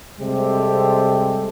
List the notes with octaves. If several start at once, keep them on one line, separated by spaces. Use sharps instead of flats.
C3 G3 G#3 C4 G4 A4